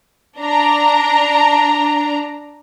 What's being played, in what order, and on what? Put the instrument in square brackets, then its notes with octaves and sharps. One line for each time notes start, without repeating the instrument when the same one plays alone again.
[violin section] D4 A#5